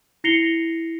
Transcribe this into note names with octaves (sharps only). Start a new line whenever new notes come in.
E4 A#6 C7 C#7 F7 G7